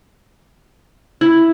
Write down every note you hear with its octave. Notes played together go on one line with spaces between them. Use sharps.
E4